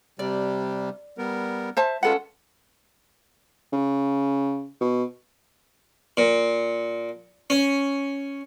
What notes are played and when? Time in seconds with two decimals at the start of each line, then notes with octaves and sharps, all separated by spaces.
0.19 C3 G3 D5
1.18 G3 B3 A#4
1.77 C5 E5 A5
2.03 G#3 C#4 F4 A4 B4 F#5
3.73 C#3
4.81 B2
6.17 A#2
7.50 C#4